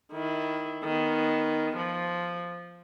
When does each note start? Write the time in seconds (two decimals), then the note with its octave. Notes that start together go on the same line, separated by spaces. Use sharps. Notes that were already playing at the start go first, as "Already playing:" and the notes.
0.12 D#3 E4
0.84 D#3 B3
1.76 F3